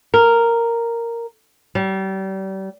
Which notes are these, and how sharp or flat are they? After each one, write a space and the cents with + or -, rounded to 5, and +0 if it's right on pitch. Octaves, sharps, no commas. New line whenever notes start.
A#4 -5
G3 -35